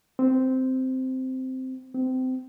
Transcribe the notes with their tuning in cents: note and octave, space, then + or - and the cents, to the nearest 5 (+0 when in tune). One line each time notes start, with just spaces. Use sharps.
C4 -10
C4 -25